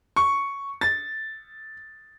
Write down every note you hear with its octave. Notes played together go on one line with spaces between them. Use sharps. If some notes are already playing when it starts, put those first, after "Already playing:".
C#6
A6